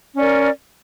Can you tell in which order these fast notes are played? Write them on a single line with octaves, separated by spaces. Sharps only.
C#4 D5 A#4